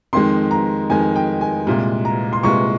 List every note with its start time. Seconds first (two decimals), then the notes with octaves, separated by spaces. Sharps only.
0.13 F2 D#3 G#3 C6
0.51 A#5
0.90 F2 D#3 G#3 G#5
1.16 G5
1.41 G#5
1.67 C2 A#2 G#3
2.05 A#5
2.33 C6
2.43 C2 A#2 G#3 C#6